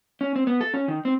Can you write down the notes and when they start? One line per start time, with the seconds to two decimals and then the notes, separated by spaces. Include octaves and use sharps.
0.21 C#4
0.36 C4
0.47 B3
0.61 A4
0.74 C#4
0.88 D#3
1.05 C4